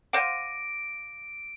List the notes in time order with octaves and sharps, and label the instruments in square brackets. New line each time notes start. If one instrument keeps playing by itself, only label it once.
[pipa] C5 F5 F#5 [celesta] D6 A#6 D#7 [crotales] D7